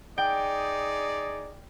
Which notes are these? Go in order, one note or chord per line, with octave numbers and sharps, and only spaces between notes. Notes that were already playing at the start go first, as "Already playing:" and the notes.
D#4 G#4 D5 G5